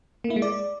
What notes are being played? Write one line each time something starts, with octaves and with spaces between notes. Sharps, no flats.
A#3
E4
G#3
D5